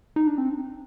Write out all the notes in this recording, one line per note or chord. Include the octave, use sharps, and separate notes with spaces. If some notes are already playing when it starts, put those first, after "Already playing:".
D#4
D4
C4